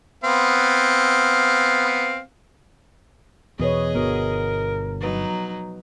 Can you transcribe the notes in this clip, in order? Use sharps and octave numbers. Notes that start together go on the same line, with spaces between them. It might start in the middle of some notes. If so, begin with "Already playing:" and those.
B3 C4 F5
E2 B2 G#4 B4 C#5 D#5
G1 B3 F#4 A#4
F3 F#3 D#4 B4